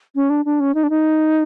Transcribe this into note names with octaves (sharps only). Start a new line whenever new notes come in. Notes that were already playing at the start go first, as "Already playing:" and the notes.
C#4
D4
D4
C#4
D#4
D4
D#4